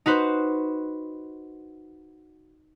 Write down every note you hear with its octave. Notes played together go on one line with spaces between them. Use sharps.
D#4 F#4 B4 C5